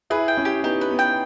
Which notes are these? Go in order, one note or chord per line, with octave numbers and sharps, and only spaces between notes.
E4 G#4 B4
G5
C#4 E4
G4
B3 D#4 G4
B4
B3
G5